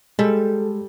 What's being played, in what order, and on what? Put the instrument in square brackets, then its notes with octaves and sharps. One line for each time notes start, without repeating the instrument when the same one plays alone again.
[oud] G3 A4 [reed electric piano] G#3